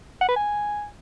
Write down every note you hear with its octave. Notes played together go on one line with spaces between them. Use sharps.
F#5
B4
G#5